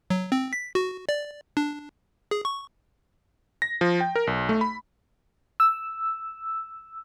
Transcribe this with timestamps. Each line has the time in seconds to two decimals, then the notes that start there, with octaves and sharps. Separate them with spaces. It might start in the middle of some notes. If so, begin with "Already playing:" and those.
0.10 F#3
0.32 C4
0.53 B6
0.75 F#4
1.09 D5
1.57 D4
2.31 G#4
2.45 C#6
3.62 A#6
3.81 F3
4.01 G5
4.16 A#4
4.27 B1
4.49 A3
4.61 B5
5.60 E6